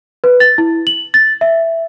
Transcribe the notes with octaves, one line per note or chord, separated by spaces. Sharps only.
B4
A6
E4
F#7
A6
E5